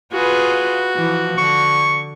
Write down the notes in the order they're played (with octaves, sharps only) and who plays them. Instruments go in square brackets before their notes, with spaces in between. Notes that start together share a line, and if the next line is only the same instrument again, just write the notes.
[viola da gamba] F4 G#4 B4 [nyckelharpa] F#4
[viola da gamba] E3 F3
[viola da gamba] D3 [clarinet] C#6